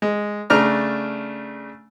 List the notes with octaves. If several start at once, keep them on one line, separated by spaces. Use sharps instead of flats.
G#3
C#3 A3 D4 A#5 F6